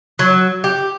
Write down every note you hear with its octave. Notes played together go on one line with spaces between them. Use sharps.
F#3
G4